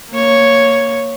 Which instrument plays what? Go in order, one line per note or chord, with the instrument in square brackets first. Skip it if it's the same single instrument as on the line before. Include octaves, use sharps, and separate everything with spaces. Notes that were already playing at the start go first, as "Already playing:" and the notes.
[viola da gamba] A#3 C#5